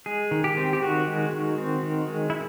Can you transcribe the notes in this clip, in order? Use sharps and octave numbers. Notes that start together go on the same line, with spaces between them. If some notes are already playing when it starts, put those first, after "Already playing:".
G#3 G#4
D#3
G4
C4
G4
D#3 F#4
G#3
D#3
C4
D#3
G#3
E4